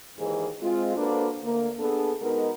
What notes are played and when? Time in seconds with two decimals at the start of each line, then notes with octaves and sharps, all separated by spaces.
0.18 D#2 G#2 D#3 E3 G#4
0.62 G#3 C4 F4
0.97 A#3 D4 F#4 A4 B4 C5
1.44 D2 A#3
1.79 B3 D4 G#4 A4
2.21 B2 G#3 B3 D#4 A#4